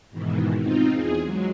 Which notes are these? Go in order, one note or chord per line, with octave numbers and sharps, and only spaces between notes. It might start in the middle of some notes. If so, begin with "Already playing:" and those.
G#2 B2 D#3 E3
C4 D#4 F4
E2 G#4
F#3 G#3